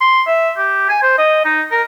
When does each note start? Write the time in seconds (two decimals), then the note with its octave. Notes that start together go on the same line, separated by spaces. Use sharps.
0.01 C6
0.26 E5
0.57 G4
0.89 G#5
1.02 C5
1.18 D#5
1.45 D#4
1.71 A#4